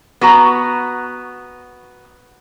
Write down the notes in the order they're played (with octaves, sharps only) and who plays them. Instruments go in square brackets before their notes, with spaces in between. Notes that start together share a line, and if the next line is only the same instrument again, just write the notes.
[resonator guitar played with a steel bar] B3 F#4 A#5